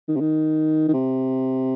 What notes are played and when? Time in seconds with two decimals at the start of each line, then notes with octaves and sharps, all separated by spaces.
0.08 D#3
0.16 C3
0.20 D#3
0.88 D#3
0.93 C3